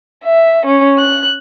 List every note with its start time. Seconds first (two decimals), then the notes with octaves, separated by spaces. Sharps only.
0.24 E5
0.66 C#4
0.98 F#6